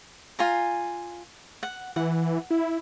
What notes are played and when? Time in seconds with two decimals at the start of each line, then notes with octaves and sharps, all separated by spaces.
0.39 F4 G#5 A#5
1.63 F#5
1.96 E3 F#5
2.51 E4